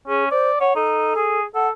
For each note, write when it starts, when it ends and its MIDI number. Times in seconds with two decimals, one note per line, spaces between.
0.08 0.29 61
0.08 0.24 68
0.31 0.50 72
0.31 0.59 74
0.60 0.73 73
0.60 0.73 78
0.76 1.15 63
0.76 1.39 69
1.16 1.44 68
1.55 1.71 69
1.55 1.67 78